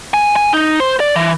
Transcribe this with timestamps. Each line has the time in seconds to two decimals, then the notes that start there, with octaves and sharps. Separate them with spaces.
0.14 G#5
0.36 G#5
0.53 D#4
0.80 C5
1.00 D5
1.16 E3